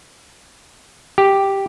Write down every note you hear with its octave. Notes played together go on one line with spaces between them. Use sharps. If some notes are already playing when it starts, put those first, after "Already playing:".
G4